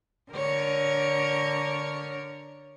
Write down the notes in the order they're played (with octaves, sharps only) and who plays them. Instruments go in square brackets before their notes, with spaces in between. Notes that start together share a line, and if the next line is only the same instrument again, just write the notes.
[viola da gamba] D3 A#4 C#5